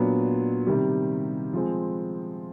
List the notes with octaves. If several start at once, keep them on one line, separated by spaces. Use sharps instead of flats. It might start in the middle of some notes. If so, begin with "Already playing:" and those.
Already playing: A#2 F#3 B3 D4
C3 D#3 G3
F3 G#3 C4